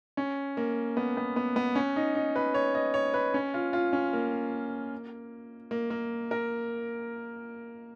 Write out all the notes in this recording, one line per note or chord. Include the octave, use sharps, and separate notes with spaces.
C#4
A#3
B3
B3
B3
B3
C#4
D#4
D#4
B4
C#5
D#5
C#5
B4
C#4
F4
F4
C#4
A#3
A#3
A#3
A#4